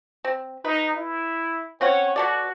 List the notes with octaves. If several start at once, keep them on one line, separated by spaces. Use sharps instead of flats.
C4
D#4 B4
E4
C4 C#4 C#5 F#5
B2 F#4 A4 D5